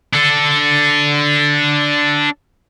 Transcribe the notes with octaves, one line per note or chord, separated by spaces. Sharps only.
D4 A4